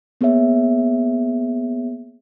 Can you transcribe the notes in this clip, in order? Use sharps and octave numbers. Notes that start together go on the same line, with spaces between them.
A#3 B3 G#4 C#5 E5